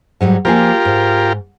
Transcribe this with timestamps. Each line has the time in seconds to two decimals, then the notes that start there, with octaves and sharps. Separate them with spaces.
0.21 G#2 F#3 G3
0.45 F3 A#3 F4 G4 G#4 A#4
0.85 G#2